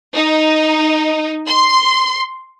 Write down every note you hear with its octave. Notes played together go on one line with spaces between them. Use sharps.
D#4
C6